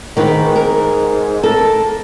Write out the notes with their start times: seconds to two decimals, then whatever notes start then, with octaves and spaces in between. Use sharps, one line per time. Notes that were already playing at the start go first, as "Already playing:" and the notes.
0.17 G#2 D#3 B4
0.56 A#4
1.43 A4 A#4